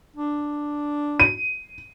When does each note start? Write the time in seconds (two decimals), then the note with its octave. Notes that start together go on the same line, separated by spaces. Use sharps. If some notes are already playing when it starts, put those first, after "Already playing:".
0.16 D4
1.20 D#7